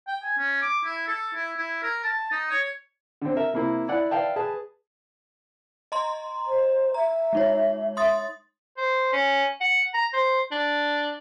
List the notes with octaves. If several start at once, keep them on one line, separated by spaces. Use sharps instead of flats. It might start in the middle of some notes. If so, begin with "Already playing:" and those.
G5
G#5
C#4
D6
E4
A4
E4
E4
A#4
A5
D#4
C#5
D3 C4
A#4 E5
C3 A#3 E4
E4 D5 F#5
B4 D5 E5 F5 G5 A5
G#4 B4 A5
D#5 A#5 C6
C5
E5 A#5
G#3 D#4 C#5
E5 C6 D#6 A6
C5
C#4
F#5
A#5
C5
D4